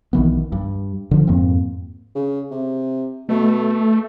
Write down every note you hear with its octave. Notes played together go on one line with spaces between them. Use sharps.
B1 D#3 E3 B3
G2
D3 F3
F2 G#2 A#3 C4
C#3
C3
B2 A3